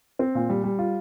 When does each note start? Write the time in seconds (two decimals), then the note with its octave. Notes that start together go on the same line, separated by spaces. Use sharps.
0.19 C4
0.35 A#2
0.49 G3
0.64 G3
0.79 F4